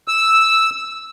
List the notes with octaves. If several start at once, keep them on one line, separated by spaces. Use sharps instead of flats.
E6